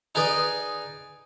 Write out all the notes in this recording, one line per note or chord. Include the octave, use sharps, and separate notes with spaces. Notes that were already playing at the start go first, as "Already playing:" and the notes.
D#4 G#4 B4 D5 D#5